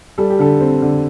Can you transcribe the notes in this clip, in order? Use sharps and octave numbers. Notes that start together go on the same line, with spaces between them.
G3 A4
G4
D3 A4
C4
D3